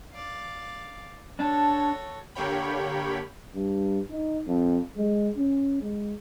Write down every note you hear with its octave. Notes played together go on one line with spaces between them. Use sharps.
D5 F5
D4 F#4 A4 C#5 A5
D3 A#3 G4 C#5 G5 B5
G2
D#4
F2
G#3
C#4
G#3